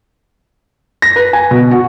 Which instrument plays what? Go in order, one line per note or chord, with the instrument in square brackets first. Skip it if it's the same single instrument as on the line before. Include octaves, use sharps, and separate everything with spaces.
[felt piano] A#6
B4
G#5
B2
F#4